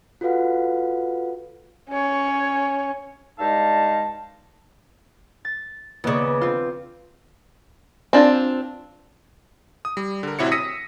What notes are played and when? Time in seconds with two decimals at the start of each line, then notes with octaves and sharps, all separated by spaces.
0.21 F4 F#4 A4 B4 F5 F#5
1.89 C#4 C#5
3.39 G2 G#3 D#4 F5 A5
5.45 A6
6.04 D#2 C#3 B3 D5
6.41 C4 F4
8.13 C4 D4 F4
9.85 D#6
9.97 G3
10.23 D3 A#4
10.39 A1 C3 E4 F#4 C#5 C#7
10.52 D#6 E6 A#6 B6 C#7 D#7